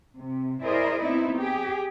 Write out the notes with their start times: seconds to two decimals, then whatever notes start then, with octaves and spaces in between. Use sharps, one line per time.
0.18 C3
0.63 E4 G#4 A#4 C5 D5 D#5
1.01 B3 C4 D#4 E4
1.39 G4 G#4